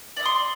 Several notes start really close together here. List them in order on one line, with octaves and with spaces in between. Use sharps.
D5 E5 D#6 C6